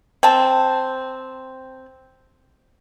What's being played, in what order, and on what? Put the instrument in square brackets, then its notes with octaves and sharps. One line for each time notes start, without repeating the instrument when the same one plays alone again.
[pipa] C4 A5